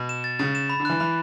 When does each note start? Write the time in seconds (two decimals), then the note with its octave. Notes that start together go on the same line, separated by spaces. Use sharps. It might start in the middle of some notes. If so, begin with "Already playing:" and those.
Already playing: B2
0.09 E7
0.24 A6
0.39 C#3 A6
0.55 E7
0.70 B5
0.80 D3
0.85 E3 F#6
1.00 E3 B5